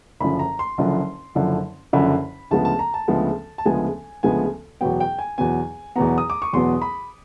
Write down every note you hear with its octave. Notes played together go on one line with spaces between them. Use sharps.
F#1 F#2 D3 F3 B5
A#5
C6
F#1 F#2 D3 F3
F#1 F#2 D3 F3
F#1 F#2 D3 F3 B5
D2 C#3 F3 G#3 B3 A5
A5
A#5
A5
D2 C#3 F3 G#3 B3
A5
D2 C#3 F3 G#3 B3 G#5
D2 C#3 F3 G#3 B3 G#5
E2 B2 F#3 B3 G5
G5
G#5
E2 B2 F#3 B3 G#5
E2 B2 F#3 B3 A#5
D#6
D6
C#6
E2 B2 F#3 B3 C6
B5